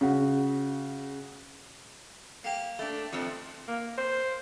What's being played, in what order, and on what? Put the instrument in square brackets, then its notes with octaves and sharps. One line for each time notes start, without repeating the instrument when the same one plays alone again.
[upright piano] C#3 C#4 F#4
[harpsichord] A#3 G4 G5
[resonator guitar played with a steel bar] A3 D4
[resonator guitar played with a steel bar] F2 F3 [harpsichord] C3
[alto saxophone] A#3
C5